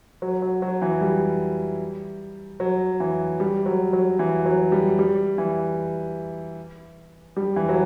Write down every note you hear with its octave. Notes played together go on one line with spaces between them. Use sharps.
F#3
F#3
F#3
E3
G3
F#3
E3
G3
F#3
F#3
E3
F#3
G3
G3
E3
G3
E3
F#3